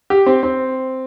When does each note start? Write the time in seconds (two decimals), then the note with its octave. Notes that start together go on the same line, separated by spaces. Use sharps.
0.10 G4
0.26 C4
0.43 C4